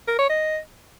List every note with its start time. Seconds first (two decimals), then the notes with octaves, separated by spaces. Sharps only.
0.08 A#4
0.19 C#5
0.29 D#5